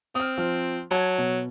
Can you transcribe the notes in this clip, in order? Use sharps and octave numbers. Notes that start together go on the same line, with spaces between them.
C4 D#6 F6
F3 F6
F#3 A5 G#6
B2